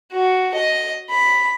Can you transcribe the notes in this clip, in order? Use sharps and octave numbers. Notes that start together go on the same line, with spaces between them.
F#4
D#5
B5